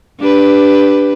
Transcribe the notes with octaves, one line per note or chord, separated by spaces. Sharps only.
D4 G4 B4